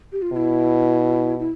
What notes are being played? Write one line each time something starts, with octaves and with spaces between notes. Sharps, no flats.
G4
F4
B2 E4 F4
E4